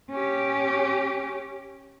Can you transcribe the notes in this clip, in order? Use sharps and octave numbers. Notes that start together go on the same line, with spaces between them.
C#4 G4